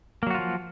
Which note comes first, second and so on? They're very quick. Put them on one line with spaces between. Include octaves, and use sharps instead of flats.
A#3 F#3 F#4 F4 F3